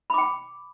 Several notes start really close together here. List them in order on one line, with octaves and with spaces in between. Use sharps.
B5 D6 G5